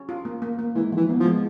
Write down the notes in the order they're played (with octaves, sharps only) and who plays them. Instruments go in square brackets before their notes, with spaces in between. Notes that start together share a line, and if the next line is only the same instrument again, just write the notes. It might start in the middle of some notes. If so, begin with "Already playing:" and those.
Already playing: [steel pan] C#4
F4
A#3
A#3
A#3
[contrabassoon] E3 [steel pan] G#3
[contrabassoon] E3 [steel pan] F3
[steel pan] B3
[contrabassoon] F3
[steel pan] G#3